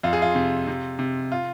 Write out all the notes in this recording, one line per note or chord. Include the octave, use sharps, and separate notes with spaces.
F2 F4
G#4
F4
C3
C3
C3
F4